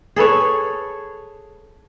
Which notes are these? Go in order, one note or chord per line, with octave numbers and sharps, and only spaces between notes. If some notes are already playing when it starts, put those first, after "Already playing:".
G#4 A4 B4 C#5